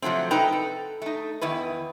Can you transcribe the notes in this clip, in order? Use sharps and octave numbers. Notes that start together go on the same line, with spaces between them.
C3 F3 F#3 A3 C4
D#4 A4 B4 G5 A#5
A4
A3 D#4
E2 D#3 E4 B4